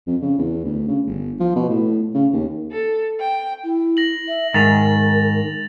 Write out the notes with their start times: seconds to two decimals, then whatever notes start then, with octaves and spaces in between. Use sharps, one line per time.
0.07 F2
0.22 C#3
0.38 E2
0.64 D2
0.88 C#3
1.07 G1
1.40 F3
1.56 B2
1.69 A2
2.14 C#3
2.33 D#2
2.71 A4
3.20 G5
3.64 E4
3.97 A#6 F#7
4.28 E5
4.54 G#2 D#3 A#4 A6 F7